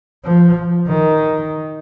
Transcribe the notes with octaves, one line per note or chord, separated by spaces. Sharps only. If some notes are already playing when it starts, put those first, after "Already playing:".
F3
D#3